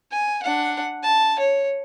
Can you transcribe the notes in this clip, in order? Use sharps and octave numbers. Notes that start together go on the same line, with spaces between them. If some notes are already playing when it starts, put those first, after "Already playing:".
G#5
D4 F#5
A5
C#5